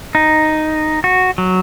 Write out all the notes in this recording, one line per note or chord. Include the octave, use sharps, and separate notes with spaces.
D#4
F#4
F#3